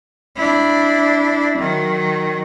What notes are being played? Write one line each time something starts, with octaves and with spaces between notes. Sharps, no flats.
D4 E4
D#3 F#3